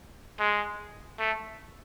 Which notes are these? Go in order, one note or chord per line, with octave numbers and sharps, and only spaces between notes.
G#3
A3